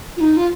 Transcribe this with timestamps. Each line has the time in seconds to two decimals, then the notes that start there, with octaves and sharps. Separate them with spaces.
0.17 F4
0.21 D#4
0.37 F4